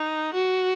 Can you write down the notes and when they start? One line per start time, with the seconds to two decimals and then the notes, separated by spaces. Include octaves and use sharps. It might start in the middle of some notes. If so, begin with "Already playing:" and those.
Already playing: D#4
0.34 F#4